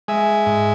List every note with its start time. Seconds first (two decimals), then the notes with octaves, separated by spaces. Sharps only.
0.08 G#3 E5 G#5
0.46 G#2